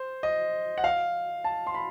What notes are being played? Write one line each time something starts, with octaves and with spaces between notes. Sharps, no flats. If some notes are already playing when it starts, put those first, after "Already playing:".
Already playing: C5
D#5
F#5
F5
A5
C6
B5